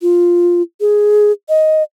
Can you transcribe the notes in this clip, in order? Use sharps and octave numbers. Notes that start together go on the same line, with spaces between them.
F4
G#4
D#5